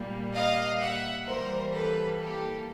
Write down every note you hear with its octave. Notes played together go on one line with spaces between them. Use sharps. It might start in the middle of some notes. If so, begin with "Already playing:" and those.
Already playing: A#2 G3 A#3
D#5 F5
E5 F#5
E3 G3 A#3 A#4 C5
A4 B4
G4 A4